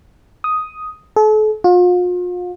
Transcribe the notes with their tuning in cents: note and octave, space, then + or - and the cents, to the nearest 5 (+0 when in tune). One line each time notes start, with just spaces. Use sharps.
D#6 +5
A4 -40
F4 +40